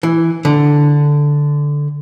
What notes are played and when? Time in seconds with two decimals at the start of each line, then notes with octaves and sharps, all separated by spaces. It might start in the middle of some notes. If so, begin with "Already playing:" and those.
0.03 E3
0.45 D3